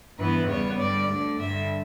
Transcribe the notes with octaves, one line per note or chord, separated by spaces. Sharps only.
G2 E3 B3 B4
E2 C#3 G3 B3 C#5
G2 D3 G3 D5
D2 D3 A3
G2 D3 G3 E5